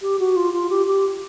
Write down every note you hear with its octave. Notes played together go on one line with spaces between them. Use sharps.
G4
F#4
F4
F4
G4
G4